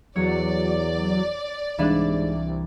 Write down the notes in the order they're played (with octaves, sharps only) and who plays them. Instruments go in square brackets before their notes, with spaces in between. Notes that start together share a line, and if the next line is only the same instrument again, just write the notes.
[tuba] E2 [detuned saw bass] F#3 [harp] C#5 [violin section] D5
[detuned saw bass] C2 [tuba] G#2 [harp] E3 D4